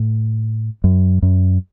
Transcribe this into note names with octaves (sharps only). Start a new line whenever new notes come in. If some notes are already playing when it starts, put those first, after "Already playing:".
Already playing: A2
F#2
F#2